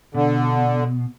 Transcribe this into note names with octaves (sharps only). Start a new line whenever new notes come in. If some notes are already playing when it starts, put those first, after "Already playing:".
B2 D3